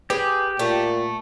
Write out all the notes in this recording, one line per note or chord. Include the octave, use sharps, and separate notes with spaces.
G4 G#4 B4
A#2 A3